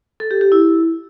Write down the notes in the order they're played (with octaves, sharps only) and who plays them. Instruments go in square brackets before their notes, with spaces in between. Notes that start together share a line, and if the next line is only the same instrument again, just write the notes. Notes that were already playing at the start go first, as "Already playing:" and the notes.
[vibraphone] A4
G4
G4
E4